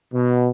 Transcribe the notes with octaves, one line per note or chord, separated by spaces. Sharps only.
B2